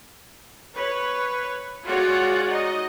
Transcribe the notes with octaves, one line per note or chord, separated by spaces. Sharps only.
B4 C#5
G#3 F4 F#4 C#5 D5 F#5
D#4 D#5